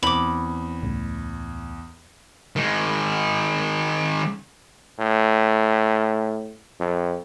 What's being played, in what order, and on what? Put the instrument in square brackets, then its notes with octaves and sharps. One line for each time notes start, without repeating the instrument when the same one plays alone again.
[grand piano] E2 [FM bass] C4 [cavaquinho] B5 D6
[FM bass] C#2 [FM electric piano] A2
[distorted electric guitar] D#3 G#3
[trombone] A2
F2